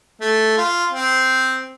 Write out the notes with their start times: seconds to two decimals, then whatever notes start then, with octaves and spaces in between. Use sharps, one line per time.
0.21 A3
0.57 F4
0.92 C4